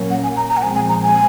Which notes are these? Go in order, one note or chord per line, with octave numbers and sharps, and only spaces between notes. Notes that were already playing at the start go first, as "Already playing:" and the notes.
Already playing: A#2 F#3 A#3 C#4
F#5
G#5
A#5
A#5
F#5
A#2 F3 G#3 C4 G#5
G#5
A#5
G#5